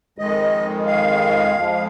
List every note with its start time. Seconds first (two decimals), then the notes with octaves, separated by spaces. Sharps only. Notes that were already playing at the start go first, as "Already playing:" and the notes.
0.18 F2 D#3 G#3 D#5
0.87 F5
1.55 F2 F3 G#3